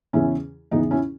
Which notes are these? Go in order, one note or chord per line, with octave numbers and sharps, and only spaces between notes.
E2 C#3 E3 C#4 E4
E2 C#3 E3 B3 D#4
C#4 E4